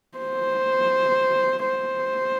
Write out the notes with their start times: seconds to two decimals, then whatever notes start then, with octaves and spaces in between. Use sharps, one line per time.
0.18 C5
1.67 C5